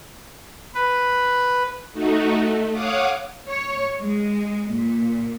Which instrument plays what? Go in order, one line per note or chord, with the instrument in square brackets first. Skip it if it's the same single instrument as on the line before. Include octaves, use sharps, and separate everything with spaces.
[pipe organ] B4
[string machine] A3 D#4 F#4
A3
C#5 F5 F#5 D6 D#6
[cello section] C#5
G#3
A#2